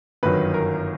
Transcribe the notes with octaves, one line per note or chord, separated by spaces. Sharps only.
G1 F#2 D#3 F#3 B4
A#4